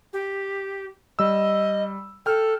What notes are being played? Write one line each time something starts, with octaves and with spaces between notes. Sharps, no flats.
G4
G3 D#5 E6
A4 G5 F6